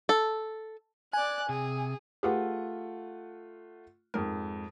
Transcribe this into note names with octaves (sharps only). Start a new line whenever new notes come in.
A4
D5 G#5 F#6
C3 G#4
A3 F4 G4 G#4 B4 F#5
F2 G#2 A#4